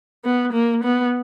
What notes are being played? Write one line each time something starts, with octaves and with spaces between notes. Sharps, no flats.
B3
A#3
B3